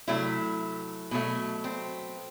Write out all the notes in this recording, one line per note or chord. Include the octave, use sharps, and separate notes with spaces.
C3 F#3 A3 E4
B2 F#3 A3
C4